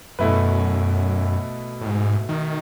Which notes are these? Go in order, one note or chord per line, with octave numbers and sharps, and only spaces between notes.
F#2 B2 A3 E4 B4
A2
G#2
D#3